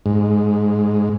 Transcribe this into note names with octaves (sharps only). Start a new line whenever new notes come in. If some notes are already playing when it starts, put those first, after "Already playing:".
G#2